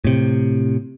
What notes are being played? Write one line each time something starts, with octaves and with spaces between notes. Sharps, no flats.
A2 C3